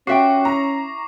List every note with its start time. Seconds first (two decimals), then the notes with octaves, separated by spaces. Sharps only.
0.07 C#4 F4 F#4 E5 G5 C#6 D6 C7
0.45 E4 A#5